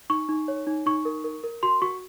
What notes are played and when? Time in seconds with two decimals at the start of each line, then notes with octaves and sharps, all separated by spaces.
0.10 D#4 C#6
0.29 D#4
0.48 C#5
0.67 D#4
0.86 D#4 C#6
1.05 A#4
1.24 A#4
1.44 A#4
1.63 F#4 C6
1.82 F#4 C#6